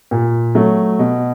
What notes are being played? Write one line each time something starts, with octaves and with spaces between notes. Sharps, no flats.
A#2
F#3 A3
B2